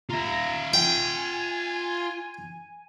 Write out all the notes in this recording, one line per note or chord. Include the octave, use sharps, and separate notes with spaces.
F4 E5 A#5
G5 G#5